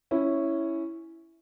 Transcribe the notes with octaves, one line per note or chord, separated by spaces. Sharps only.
C#4 E4